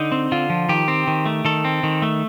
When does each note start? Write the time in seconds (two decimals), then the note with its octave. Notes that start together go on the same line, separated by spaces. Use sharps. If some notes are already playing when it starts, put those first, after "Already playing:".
Already playing: D3 D#4
0.12 C4
0.32 D3 F4
0.50 F3
0.69 D#3 G4
0.88 C4
1.07 D#3
1.26 A3
1.45 D#3 A4
1.64 C4
1.83 D#3
2.02 A3